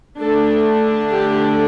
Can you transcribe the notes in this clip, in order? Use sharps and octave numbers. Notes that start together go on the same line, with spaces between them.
D3 A3 D4 A4
G4